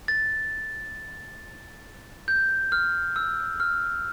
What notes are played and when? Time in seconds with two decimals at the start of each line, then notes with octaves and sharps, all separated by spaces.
0.08 A6
2.28 G6
2.72 F6
3.16 E6
3.60 F6